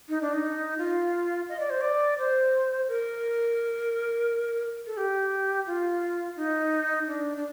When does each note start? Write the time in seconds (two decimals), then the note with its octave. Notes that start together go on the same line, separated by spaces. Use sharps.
0.09 D#4
0.21 D4
0.34 D#4
0.78 F4
1.49 D#5
1.60 D5
1.70 C5
1.81 D5
2.18 C5
2.88 A#4
4.87 A4
4.97 G4
5.66 F4
6.36 D#4
7.07 D4
7.37 D4